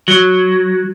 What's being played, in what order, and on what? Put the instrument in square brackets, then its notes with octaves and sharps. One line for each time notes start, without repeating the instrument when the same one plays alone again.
[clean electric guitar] F#3